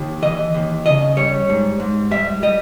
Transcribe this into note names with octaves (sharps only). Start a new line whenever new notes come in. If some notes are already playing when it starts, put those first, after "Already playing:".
Already playing: D#2
E3 D#5
D#2
C#3 D#5
G3 C#5
G#2
G#2
G3 E5
G3 D#5